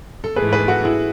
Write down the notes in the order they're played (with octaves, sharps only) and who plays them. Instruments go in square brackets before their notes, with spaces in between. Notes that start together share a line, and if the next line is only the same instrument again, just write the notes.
[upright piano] A4
[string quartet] G#2 E3 A3 [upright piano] G#4 B4
[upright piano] G#4 B4
F#4 A4
E4 G#4